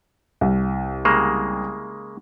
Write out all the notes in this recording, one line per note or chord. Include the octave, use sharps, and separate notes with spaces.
C2
C#3 G#3 A#3